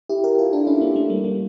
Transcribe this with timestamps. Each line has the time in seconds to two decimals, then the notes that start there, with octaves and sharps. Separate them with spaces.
0.09 E4 G4
0.24 G4 A#4
0.39 F4 A4
0.53 D4 F4
0.67 C#4 E4
0.81 A#3 D4
0.96 A3
1.10 G3 A#3
1.24 G3 A#3